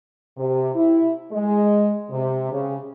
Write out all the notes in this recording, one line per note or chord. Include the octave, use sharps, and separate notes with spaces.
C3
E4
G#3
C3
C#3